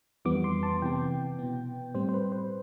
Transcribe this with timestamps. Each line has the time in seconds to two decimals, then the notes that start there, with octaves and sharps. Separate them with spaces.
0.25 F2 E3 G3 B3 D6
0.44 C6
0.63 A5
0.82 C3 E3 B3 G5
1.39 B2 B3
1.95 A2 G3 C4 C5
2.09 C5
2.14 B4
2.32 C5